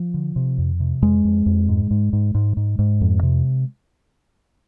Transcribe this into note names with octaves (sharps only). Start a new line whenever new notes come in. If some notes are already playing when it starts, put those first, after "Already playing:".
Already playing: F3
D3
C3
F2
C3
F2 G#3
F2
F2
G#2
G#2
G#2
G#2
G#2
G#2
F2
C3